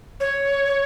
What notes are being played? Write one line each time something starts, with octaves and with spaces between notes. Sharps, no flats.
C#5